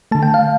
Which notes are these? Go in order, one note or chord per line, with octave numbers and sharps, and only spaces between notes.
D3 A3 A5
G5
F5